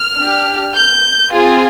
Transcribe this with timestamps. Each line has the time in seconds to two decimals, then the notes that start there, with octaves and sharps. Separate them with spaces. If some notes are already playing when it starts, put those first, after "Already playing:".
Already playing: F6
0.17 D4 G4
0.74 G6
1.33 C4 F4 G#4